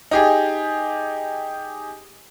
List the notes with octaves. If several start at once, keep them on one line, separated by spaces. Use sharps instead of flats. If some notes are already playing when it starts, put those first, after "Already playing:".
D#4 G4 G#4